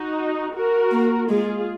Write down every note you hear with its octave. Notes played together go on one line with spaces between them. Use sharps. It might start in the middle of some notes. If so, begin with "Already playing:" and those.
Already playing: D#4 F#4
F#4 A#4
A#3
G#3 F4 G#4